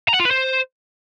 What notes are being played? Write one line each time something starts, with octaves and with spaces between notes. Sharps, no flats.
A#5
F#5
F4
B4
C5